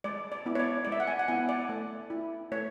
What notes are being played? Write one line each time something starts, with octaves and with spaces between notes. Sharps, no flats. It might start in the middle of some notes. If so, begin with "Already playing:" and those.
G#3 D5
D5
B3 E4
C#5
D5
G#3 D5
E5
F#5
G#5
F#5
B3 E4 G#5
D5
A3
E4
A3 C#5